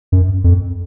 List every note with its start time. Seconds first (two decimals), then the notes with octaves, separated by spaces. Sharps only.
0.12 F#2
0.44 F2